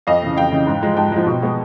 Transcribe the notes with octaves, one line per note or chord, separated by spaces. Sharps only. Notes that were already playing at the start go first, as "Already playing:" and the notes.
F2 D#5 F5
C#3 E3
F2 F5 G5
C#3 E3
G#2
F3 G#3
G#2 G5 A5
F3 G#3
B2
G#3 B3